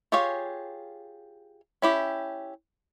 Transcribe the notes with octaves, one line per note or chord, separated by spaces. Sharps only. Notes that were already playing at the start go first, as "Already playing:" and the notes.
F4 G4 G#4 C#5 F5
C#4 E4 G4